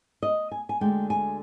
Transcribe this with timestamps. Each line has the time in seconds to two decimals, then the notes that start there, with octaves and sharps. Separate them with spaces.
0.23 D#5
0.52 G#5
0.69 G#5
0.81 D2 D3 G#3 G5
1.10 G#5